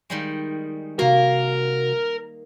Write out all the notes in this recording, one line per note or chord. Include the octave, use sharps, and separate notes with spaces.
D#3 G3 G#3
C3 A#3 F#4 A#4